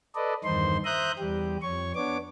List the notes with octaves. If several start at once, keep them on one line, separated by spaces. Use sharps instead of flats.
A4 B4 D5 D#5
E2 G2 D#3 D#4 C5 C6
C5 E5 A#5 D#6 F#6 G6
E2 G3 G4
F2 C#5 C#6
B3 D4 C#5 D6